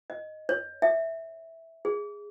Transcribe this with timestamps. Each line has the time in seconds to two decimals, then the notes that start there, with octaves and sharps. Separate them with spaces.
0.10 D#5
0.49 C#5
0.82 E5
1.85 G#4